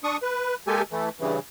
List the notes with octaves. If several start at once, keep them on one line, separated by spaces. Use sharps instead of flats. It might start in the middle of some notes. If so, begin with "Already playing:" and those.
D4 C#6 D#6
B4
G#3 A#3 G4 A4 G#5
E3 A3
G2 C#3 E3